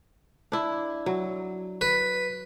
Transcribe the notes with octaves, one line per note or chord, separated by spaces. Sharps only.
D4 E4
F#3
B4